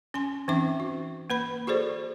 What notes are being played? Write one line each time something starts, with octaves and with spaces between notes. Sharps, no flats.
C#4 G#5 C6
E3 C4 C#4 D#4 E5 D6
F#4
A#3 B4 B5
F#4 G#4 A4 C5 D5